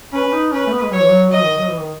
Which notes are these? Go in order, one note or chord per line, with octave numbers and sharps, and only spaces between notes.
C#4 B4
C#4
D#4
C#4 B4
A3
B3
G#3
F#3 C#5
E3
F#3
F#3 D#5
D#3
F#3
E3
D#3